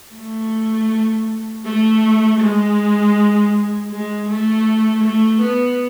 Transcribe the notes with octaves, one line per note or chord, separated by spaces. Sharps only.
A3
A3
G#3
G#3
A3
A3
B3